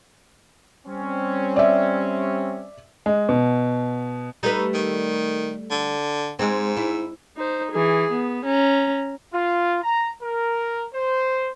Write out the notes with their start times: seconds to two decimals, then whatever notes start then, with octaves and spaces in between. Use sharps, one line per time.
0.86 G3 C4 C#4
1.56 D5 E5
3.06 G#3
3.29 B2
4.43 G3 A3 D#4 B4
4.74 D#3
5.70 D3
6.39 G#2 G#3 C4
6.77 E4
7.37 D#4 C5
7.72 E3 G#4
8.12 B3
8.45 C#4 A#5
9.34 F4
9.83 A#5
10.22 A#4
10.95 C5